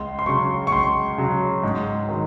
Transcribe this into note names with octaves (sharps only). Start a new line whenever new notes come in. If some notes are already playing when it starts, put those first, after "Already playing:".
Already playing: C#2 C6
C6
C#3 F#3 C#6
C#6
C#2 C6
C#3 F#3
G#2
D#3 F#3